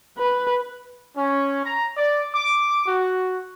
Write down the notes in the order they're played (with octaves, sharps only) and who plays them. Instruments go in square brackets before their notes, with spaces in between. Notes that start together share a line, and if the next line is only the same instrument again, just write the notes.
[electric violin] B4
[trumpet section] C#4
A#5
D5
D6
F#4